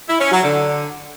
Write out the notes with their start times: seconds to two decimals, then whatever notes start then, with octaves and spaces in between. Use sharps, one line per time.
0.08 E4
0.20 C#4
0.31 F#3
0.43 D3